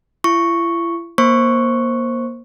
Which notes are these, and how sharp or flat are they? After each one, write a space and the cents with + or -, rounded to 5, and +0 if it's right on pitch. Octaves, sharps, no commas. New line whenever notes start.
E4 +40 C#6 +0
A#3 +20 C5 +15 C#6 +0